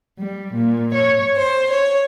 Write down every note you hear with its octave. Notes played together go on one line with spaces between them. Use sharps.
G3
A#2
C#5
C5
C#5